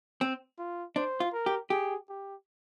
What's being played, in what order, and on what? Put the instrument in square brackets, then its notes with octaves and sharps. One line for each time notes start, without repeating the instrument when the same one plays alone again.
[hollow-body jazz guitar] C4
[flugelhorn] F4
[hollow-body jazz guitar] D4 [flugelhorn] C5
[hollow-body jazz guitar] F4
[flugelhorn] A#4
[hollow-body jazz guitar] G4
[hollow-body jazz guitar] G4 [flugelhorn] G#4
[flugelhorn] G4